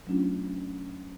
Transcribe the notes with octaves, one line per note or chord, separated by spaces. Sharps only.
F#3 A3 C#4 D4 F4